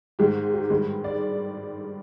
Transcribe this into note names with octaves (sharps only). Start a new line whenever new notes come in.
G#2 D#3 G#3 G4
G4
G2 D#3 G#3
D5